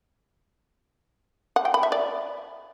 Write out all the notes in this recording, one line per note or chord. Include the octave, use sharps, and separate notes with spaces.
F#5
G5
B5
E5
D5